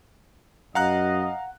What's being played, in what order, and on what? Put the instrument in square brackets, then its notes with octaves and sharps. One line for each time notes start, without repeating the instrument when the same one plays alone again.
[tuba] F#2 [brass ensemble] D#5 [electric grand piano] F5 A#5 F#6 [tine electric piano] F#5